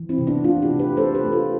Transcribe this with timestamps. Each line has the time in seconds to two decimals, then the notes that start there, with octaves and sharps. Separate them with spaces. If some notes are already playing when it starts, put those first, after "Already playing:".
Already playing: E3
0.09 C4 E4
0.18 C3
0.27 B3 D4
0.44 A3 D4 F4
0.62 E4 G4
0.71 C3
0.79 G4 B4
0.97 A3 A4 C5
1.15 G4 B4
1.24 A3
1.32 F4 A4